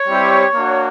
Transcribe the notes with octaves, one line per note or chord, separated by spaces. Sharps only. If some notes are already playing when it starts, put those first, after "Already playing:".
Already playing: C#5
G3 C4 E4 G4
A#3 D4 F#4